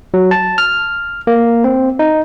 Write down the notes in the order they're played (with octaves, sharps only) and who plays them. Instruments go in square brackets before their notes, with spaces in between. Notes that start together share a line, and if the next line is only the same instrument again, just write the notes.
[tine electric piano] F#3
A5
F6
A#3
C4
D#4